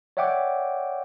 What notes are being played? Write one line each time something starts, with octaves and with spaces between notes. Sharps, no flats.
C#5 D5 E5 F#5 G5 D6